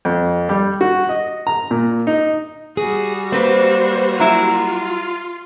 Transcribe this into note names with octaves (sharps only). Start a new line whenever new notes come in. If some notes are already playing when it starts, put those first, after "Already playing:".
F2
G3
F#4
D#5
A#5
A#2
D#4
G3 F#4 G#4
A#3 C4 B4 C5 D5
F#3 E4 F4